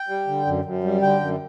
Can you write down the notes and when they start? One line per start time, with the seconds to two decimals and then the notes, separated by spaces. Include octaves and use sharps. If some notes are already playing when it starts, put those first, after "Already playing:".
Already playing: G5
0.08 G3
0.27 D3
0.46 F#2
0.65 F#2
0.84 G3
1.02 D3 G5
1.21 F#2